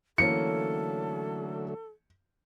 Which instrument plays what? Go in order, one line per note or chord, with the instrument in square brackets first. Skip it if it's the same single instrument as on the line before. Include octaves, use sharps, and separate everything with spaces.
[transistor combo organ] D3 F#3 A3 [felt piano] E3 A#3 C#4 [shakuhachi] A4 [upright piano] C#7